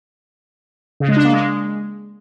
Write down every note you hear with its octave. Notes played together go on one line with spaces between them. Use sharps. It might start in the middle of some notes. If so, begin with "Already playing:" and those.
C#3
G#3
D4
A#3
G#3